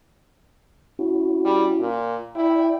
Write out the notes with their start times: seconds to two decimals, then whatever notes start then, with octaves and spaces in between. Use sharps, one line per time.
0.99 C#4 E4 F#4
1.45 G3
1.80 A#2
2.35 E4 D5 G5